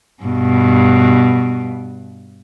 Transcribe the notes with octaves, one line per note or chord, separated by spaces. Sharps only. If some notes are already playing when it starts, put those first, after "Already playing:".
G2 B2